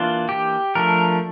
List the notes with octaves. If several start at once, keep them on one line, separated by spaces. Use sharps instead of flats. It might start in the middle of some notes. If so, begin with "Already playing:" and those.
Already playing: E3 A#3 D4 F4
G4
F3 A3 D4 A#4